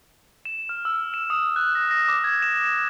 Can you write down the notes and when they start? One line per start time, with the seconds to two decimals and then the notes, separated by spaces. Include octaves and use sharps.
0.45 E7
0.69 F6
0.85 E6
1.14 E7
1.30 D#6
1.56 F#6
1.75 A#6
1.91 A#6
2.08 D6
2.24 G#6
2.42 E7
2.65 E7